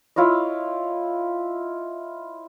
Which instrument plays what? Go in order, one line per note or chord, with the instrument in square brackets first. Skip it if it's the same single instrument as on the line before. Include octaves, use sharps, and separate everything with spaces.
[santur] E4 F4 C#5 D#5